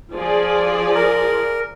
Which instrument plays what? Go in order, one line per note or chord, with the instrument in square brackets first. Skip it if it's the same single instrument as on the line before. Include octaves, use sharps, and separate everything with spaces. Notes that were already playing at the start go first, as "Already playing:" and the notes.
[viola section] F3 G#4 D5
[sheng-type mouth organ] A#4